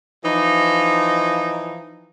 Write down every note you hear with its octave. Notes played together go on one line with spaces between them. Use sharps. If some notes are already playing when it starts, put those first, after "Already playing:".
E3 F3 D#4